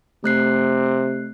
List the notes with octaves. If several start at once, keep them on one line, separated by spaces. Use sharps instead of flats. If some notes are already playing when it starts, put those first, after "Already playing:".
C3 A3 F#6 C7